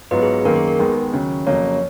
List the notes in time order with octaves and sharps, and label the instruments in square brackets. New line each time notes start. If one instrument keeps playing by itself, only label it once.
[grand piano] G#2 F#3 B3 F4 [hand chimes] B4
[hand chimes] G#4
G#4
[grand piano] F#2 D#3 A#3 [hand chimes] A#4
[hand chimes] G#4
A#4
[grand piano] D#2 D#3 G#3 B3
D#2 C#3 F#3
[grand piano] F2 C#3 F#3 A#3 [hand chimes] C#5